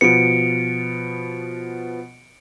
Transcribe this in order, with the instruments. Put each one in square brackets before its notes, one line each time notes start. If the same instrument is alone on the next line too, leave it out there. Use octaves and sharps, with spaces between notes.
[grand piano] B2 F3 B3 [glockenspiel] C#7 D7